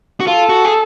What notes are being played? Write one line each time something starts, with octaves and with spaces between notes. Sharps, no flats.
F#4
F4 A4
F#4
G#4